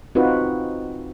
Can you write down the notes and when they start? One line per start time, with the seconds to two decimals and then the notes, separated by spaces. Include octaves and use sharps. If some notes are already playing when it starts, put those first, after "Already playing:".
0.15 C4 D#4 F4 F#4 B4